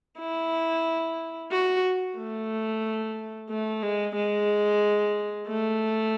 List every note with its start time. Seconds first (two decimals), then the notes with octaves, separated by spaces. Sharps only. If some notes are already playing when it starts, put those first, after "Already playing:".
0.19 E4
1.52 F#4
2.17 A3
3.50 A3
3.83 G#3
4.16 G#3
5.48 A3